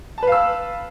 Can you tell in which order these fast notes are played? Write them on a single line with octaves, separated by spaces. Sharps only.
A5 B4 F5 E6